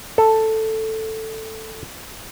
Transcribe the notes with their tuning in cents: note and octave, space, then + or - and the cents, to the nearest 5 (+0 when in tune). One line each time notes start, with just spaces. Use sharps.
A4 +5